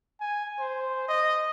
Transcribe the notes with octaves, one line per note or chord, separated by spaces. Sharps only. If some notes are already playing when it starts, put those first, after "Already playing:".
G#5
C5
D#5